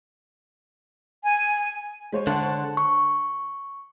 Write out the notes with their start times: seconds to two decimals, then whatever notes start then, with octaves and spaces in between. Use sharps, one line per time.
1.23 G#5
2.12 G#3 C5 C#5
2.27 D3 F#5 A5 C6
2.77 C#6